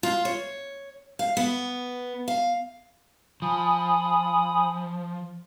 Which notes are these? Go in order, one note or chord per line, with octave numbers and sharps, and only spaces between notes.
F4
C#5
F5
B3
F5
F3 G#5 B5 D#6